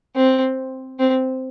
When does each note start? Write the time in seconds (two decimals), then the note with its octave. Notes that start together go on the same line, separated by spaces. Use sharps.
0.16 C4
0.99 C4